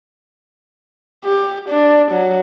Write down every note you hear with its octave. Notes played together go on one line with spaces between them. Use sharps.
G4
D4
F#3